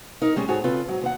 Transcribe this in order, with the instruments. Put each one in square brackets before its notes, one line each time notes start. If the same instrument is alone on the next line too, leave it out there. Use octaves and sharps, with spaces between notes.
[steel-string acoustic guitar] D#4 A#4
G3 G#3 C#4
G#2 F#4 G#4 A4 C#5 G#5
C#3 C4 F4 A4 B4
G#2 F#3
D#2 C5 F#5